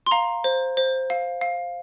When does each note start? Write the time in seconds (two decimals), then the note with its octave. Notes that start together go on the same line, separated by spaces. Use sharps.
0.06 C6
0.11 F5 A#5
0.44 C5
0.77 C5
1.10 F5
1.41 F5